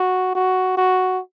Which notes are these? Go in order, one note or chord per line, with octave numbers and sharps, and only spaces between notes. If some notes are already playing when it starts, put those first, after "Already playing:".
Already playing: F#4
F#4
F#4